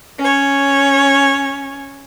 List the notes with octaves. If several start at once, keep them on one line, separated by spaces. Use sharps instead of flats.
C#4 C#5